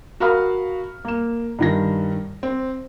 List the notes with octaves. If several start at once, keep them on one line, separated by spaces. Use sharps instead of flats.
F#4 A#4 F5 B5 D#6 F6
A#3 E7
G2 D#3 A#6
C4